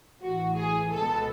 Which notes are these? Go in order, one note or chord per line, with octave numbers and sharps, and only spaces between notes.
A1 A2 E3 F#4
G#4
C#2 B2 G#3 B3 A4